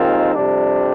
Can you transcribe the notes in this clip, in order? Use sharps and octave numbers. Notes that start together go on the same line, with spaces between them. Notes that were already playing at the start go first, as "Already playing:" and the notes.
Already playing: D#2 D#3 G#3 C4 F4
F2 C3 G3 D4